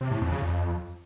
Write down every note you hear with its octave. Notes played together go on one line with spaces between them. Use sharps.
C3
A2
F2
C#3
F2